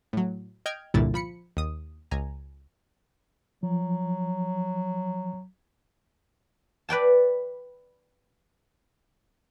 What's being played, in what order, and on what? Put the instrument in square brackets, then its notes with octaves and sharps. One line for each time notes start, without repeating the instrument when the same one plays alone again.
[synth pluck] A2 F#3
D#5 G5 F6 G6 G#6 D7
G1 C2 A#2 D3 E4 A6
F3 B5 C#7
D#2 D#6
C#2 G#5 A#5
[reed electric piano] F3 [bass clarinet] F#3
[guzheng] B4 D5 G5 A5